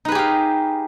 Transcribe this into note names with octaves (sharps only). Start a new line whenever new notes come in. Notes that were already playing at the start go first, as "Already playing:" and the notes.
D#4 G4 G#4 B4 F5